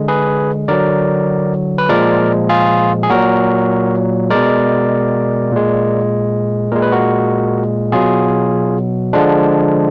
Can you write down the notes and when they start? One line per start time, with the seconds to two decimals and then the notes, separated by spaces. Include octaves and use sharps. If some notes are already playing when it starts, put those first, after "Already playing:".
Already playing: D3 G#3
0.08 G#4 B4
0.68 D3 F#3 A#4 D5
1.78 B4
1.89 A#2 F3 G#3 A#4 D5
2.49 F4 G#4
3.03 G#4
3.10 A#2 F#3 F#4 A#4
4.30 B2 G#3 A#4 D5
5.51 A#2 G#3
6.72 A#2 G#3 A#4
6.82 B4
6.92 F#4 A#4
7.92 B2 F#3 F4 G#4
9.13 D3 F3 G#3 D4